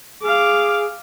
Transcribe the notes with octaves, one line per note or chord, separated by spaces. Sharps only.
G#4 F5 D6